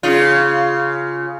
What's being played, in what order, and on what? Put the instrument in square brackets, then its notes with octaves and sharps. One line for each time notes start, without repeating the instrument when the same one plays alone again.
[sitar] C#3 F4